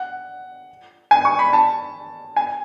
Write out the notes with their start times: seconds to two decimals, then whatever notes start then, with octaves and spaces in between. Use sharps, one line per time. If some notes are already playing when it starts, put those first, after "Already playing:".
Already playing: F#5
1.11 G#5
1.25 C#6
1.39 B5
1.53 A5
2.36 G#5